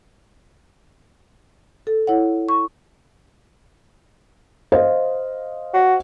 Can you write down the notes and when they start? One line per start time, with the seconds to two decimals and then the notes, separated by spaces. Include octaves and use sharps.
1.87 A4
2.07 E4 C#5 F#5
2.49 C#6
4.72 C5 D#5 F5
5.74 F#4